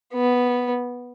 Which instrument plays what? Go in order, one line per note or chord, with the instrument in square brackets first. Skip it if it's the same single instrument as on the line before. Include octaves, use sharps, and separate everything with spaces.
[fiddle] B3